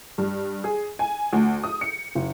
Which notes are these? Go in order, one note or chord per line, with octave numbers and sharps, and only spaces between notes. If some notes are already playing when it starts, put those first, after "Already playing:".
G2
G#4
G#5
D2
D#6
C#7
F#1